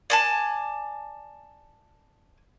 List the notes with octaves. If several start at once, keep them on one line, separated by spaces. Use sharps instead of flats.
D5 G#5 A5